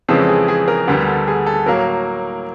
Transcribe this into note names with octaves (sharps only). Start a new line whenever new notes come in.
F2 C#3 E3 G#3 C4 A4
G#4
G#4
A#4
D2 D3 G3 B3 A#4
A4
G#4
A4
A2 F#3 A#3 A#4